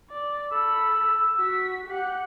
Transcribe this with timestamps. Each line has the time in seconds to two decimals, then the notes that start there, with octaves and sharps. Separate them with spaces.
0.10 D5
0.52 A4 B5 E6
1.37 F#4 B6
1.88 G4 F#5